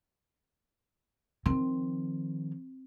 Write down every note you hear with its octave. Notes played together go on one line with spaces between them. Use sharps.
D#3 F3 C4